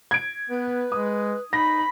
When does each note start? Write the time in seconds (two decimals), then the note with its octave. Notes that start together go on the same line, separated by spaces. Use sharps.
0.11 G#6 D7
0.49 B3 B4
0.92 G#3 D#6
1.53 D#4 B5 A#6